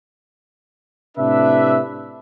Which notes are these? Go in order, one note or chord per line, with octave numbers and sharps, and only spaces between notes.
A2 C3 D4 B4 E5